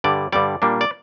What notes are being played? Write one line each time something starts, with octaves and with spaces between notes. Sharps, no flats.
G2 D3 G3 D5
G2 D3 G3 D5
A#2 G3 A#3 D4
D5